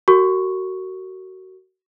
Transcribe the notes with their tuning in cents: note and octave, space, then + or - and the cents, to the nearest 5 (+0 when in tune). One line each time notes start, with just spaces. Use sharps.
F#4 +20 A#4 -35 C#6 +0